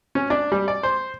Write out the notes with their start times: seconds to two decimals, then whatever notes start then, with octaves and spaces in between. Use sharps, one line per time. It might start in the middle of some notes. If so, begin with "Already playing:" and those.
0.15 C#4
0.30 D4
0.52 G3
0.68 D5
0.83 C5